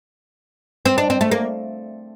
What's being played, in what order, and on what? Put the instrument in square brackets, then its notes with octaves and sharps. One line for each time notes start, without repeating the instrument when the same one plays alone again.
[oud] C4
D4
C4
A3
A#3